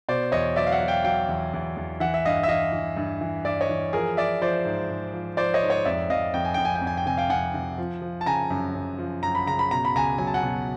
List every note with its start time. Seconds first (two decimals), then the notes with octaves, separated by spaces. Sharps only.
0.09 B2 C5 D5
0.32 E2 C#5 D#5
0.56 F#3 D5 E5
0.67 F5
0.72 E5 F#5
0.80 F#3
0.88 F5 G5
1.04 F#3 F5 G5
1.29 E2
1.53 E2
1.77 E2
2.00 E3 E5 F#5
2.14 E5
2.25 G2 D#5 F5
2.43 E5
2.48 E3 D#5 F5
2.73 E3
2.97 G2
3.21 E3
3.45 G2 D5 E5
3.61 C#5 D#5
3.69 E3
3.93 F3 G#4 A#4
4.17 F3 D5 E5
4.42 F3 C5 D5
4.65 G#2
4.90 G#2
5.13 F3
5.37 F3 C5 D5
5.54 C#5 D#5
5.62 G#2
5.70 C#5 D#5
5.85 F2 D5 E5
6.10 F2 D#5 F5
6.34 F2 G5
6.45 G#5
6.54 F2 G5
6.65 G#5
6.75 G5
6.81 F2
6.87 G#5
6.97 G5
7.06 C3 G#5
7.17 F5 G5
7.30 F2 F#5 G#5
7.54 C3
7.78 F3
8.02 F3
8.21 A5
8.26 C#3 G#5 A#5
8.50 F#2
8.75 F#2
8.99 F3
9.23 F#2 A#5
9.35 B5
9.46 C#3 A#5
9.59 B5
9.71 B2 A#5
9.85 B5
9.95 C#2 G#5 A#5
10.18 F#3 G#5
10.27 A5
10.34 F#5 G#5
10.43 B2